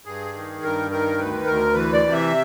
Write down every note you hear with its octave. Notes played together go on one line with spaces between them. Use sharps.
G2 G#4
D#3
G2 A#4
D#3 A#4
D2 B4
D2 A#4
E3 B4
D5
C3
E5